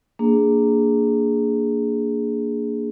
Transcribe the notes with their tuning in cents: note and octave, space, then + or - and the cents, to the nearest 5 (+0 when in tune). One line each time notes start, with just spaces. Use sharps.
A#3 -15 D4 +0 G#4 +0